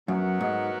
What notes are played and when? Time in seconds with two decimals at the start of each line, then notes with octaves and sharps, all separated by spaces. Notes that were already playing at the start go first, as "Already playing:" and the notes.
0.08 F#2 F#3 B3 F#4 A#4
0.41 G#2